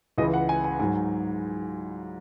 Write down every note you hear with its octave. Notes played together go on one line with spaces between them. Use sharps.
C#2 C#3 E3 D#5
F#5
G#5
G#5
G#2 F#3 G#5